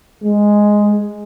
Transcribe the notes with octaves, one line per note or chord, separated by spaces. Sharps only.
G#3